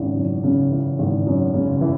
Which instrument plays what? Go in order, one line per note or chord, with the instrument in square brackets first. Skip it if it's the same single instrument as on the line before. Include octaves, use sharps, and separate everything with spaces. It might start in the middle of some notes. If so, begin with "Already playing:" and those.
Already playing: [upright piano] G#1 F#2 C#3 E3
F#2
C#3
E3
G#1
F#2
C#3
E3